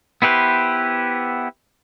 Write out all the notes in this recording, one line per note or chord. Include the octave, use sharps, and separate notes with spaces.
B3 E4 G4 B4 C5